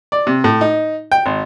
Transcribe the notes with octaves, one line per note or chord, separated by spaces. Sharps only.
D5
C3
A2
D#4
G5
G#1